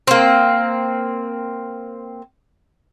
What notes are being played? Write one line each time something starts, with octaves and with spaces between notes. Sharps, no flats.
A#3 C4